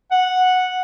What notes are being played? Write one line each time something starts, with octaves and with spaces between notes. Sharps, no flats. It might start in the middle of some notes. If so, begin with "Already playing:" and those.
F#5